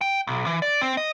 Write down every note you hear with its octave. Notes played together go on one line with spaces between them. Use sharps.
G5
B1
E3
D5
C4
D#5